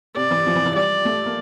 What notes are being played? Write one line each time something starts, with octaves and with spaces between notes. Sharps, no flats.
C3 D5
E3
F3
E3
E3
G3 D5
A3
A#3